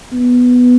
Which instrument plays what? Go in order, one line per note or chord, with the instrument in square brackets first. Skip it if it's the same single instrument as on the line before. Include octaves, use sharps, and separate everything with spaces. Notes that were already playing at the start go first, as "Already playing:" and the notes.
[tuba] B3